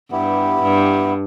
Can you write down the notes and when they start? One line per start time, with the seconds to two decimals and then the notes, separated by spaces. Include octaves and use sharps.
0.11 G2 B3 E4 G4
0.62 G2